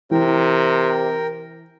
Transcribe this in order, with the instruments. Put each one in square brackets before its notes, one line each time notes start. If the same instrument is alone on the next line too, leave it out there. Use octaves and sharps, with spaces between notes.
[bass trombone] C3 [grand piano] E3 [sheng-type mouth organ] A#4 G5